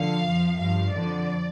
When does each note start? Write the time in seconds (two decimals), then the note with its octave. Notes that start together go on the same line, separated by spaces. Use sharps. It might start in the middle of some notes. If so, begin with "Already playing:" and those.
Already playing: D3 F3 F5
0.26 F2 F3
0.59 G2 F3 F5
0.93 F2 D3 F3 D5